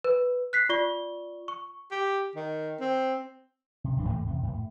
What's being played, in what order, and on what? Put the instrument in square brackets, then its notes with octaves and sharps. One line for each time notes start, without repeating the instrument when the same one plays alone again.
[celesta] B4
F#6 B6 C7
F4 D5 C#6 G7
C#6
[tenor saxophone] G4
D#3
C4
[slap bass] C3
D1 E2 F#3 D4
G#2 E3 A3 A#3
E2 C3 E3
F#2 A#2
A2